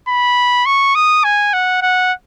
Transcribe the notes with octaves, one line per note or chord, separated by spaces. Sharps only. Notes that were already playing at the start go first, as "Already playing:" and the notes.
B5
C#6
D#6
G#5
F#5
F#5